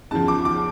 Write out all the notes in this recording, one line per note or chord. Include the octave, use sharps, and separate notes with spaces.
E2 C#3 F3 A5
D6
D6